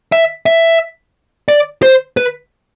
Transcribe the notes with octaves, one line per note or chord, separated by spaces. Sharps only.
E5
E5
D5
C5
B4